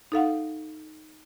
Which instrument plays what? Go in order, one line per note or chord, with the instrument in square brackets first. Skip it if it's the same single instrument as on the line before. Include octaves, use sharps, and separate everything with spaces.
[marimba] D#4 A4 F5 F#5